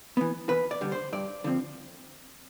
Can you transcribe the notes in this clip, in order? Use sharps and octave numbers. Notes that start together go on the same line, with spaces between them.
E3 B3
E2 B4
D5
D3 G3
C5
G2 D5
D3 F3 C4